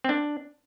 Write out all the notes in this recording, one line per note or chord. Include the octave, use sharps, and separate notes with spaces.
C4
D4